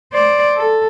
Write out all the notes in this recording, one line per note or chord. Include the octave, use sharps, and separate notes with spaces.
C5 D5
A4